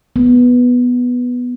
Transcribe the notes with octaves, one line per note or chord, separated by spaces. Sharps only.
B3